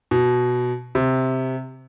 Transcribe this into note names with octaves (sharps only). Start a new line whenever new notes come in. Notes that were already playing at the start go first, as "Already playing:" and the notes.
B2
C3